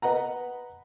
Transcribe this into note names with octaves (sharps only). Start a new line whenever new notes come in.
B4 D#5 F#5 A#5